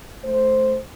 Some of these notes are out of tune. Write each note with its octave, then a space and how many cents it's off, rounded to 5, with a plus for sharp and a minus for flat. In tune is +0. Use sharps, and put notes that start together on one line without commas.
A3 -20 C5 +0